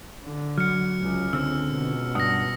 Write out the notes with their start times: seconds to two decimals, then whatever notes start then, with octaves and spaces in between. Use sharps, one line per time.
0.24 D3
0.58 F#3 F6 C#7
1.02 C#2
1.33 D3 C4 E6
1.68 C#2 B2
2.15 G2 D4 F#5 D#6 A#6